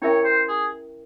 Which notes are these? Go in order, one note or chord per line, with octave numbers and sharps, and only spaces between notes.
C#4 E4 A#4 C#5 E5 G5
C5
G#4